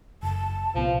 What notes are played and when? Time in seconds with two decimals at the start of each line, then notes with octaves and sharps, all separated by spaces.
0.23 F#1 A5
0.75 C2 A#2 F3 B3